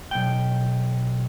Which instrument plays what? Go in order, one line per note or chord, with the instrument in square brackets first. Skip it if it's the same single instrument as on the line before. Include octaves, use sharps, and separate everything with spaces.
[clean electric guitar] B1 G5